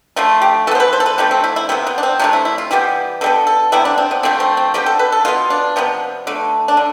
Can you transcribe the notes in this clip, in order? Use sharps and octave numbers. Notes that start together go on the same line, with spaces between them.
D3 F3 A3 F4
G4
E3 B3 A4 C5
B4
C5
A4
B4
D3 F3 A3 G4
C4
E4
E4
C3 G3 B3 C4
B3
D4
C4
C3 F3 A3 D4
E4
E4
F4
E3 G3 B3 G4
D3 G3 B3 A4
A4
C3 G3 B3 E4
D4
C4
B3
D3 F3 A3 C4
C4
C4
D3 G3 B3 G4
A4
B4
A4
B2 B3 F4
D4
C3 F3 B3
D3 A3
D4
D3